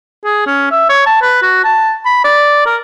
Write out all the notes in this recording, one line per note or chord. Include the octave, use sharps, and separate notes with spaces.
G#4
C#4
E5
C#5
A5
B4
F#4
A5
B5
D5
A#4